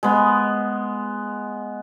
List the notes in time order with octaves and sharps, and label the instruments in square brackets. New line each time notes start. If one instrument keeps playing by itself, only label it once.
[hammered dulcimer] G#3 B3